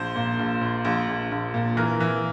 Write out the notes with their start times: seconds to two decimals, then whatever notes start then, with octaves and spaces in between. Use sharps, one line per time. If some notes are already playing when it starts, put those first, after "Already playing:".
Already playing: A#1 C5
0.15 A#2
0.39 A#1
0.61 A#1
0.85 A#1
1.07 A#1
1.31 A#1
1.54 A#2
1.77 E3 A#4
2.00 E3